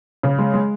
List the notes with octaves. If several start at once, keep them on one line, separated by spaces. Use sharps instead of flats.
C#3
G#3
G#3